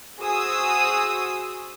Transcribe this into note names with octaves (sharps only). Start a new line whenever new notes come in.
F#4 G#4 C5 D#6 E6